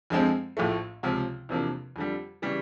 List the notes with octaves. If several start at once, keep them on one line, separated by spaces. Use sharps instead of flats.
F2 D3 F3 G#3 C4
A#1 A2 F3 A3
C#2 C3 F3
E2 C3 F3 A#3 D4
F2 D3 G3
C#3 E3 G3